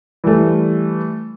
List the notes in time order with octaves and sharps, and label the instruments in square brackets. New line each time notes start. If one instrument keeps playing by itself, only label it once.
[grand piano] E3 G3 A3